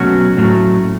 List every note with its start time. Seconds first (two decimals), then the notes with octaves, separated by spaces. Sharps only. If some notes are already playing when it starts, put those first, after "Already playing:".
Already playing: B2 F#3 A3 C#4 F#4
0.37 A2 F#3 A3